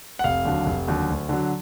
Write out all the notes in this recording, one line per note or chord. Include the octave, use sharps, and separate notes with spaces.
F#5
F1 F5
D#2 D3 F#3
F1
D#2 D3 F#3
D2
D3 F#3